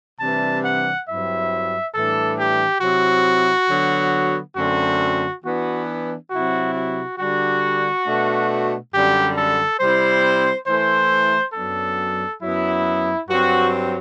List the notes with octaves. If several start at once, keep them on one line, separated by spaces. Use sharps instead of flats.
C3 E3 G3 D4 A5
F#5
G2 F#3 C4 E4 E5
A2 E3 G3 D4 A4
G4
C3 F#3 C4 E4 F#4
D3 F#3 B3
F#2 D3 A3 C4 F#4
E3 B3 D4 F#4
C3 F#3 C4 E4 F#4
F#4
D3 G3 D4 F#4
B2 A3 D4
F#2 D3 G3 D4 G4
A4
C3 G3 C4 E4 C5
E3 A3 E4 C5
F#2 F#3 B3 D4 A4
F#2 F#3 B3 E4
G2 F#3 C4 F#4